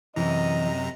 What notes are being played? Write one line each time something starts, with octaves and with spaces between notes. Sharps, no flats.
F#2 C3 E3 D#5 A#5